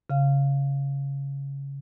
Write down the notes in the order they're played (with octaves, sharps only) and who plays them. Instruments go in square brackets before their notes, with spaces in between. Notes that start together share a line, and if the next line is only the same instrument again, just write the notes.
[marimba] C#3 F5